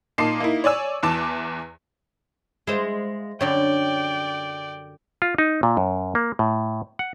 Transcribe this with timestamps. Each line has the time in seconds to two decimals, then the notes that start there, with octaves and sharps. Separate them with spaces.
0.18 A#2 D#4 A5 D6 C7
0.40 A#3 D#4 E4
0.64 C#5 D5 G#5 E6
1.03 E2 E3 A5 D6
2.67 G#3 E4 F4 C5
3.41 F#2 D3 G3 C#5 D5 G5
5.22 F4
5.38 D#4
5.63 A#2
5.77 F#2
6.15 A#3
6.39 A2
6.99 F#5